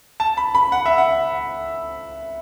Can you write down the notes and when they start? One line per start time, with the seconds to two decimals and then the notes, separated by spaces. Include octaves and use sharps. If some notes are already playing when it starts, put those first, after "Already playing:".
0.20 A5
0.37 B5
0.55 B5
0.72 F#5
0.86 E5
0.98 F#5